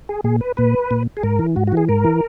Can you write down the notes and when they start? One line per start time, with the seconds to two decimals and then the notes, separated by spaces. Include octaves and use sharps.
0.09 G#4
0.24 A#2 G#4
0.41 B4
0.57 A#2 B4
0.91 A#2
1.17 G#4
1.23 G#2 A#4
1.39 E3
1.56 G#2 F#4
1.67 F#4
1.72 E3 G#4
1.88 G#2 A#4
2.04 E3